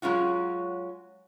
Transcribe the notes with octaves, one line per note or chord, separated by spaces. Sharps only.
F#3 G#3 C#4 F4 F#4